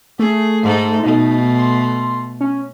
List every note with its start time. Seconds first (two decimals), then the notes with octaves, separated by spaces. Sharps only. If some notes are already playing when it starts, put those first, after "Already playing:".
0.19 A3 G#4
0.63 G#2 D#4 A4
1.03 B2 A3 D#4
1.58 C6
2.41 C#4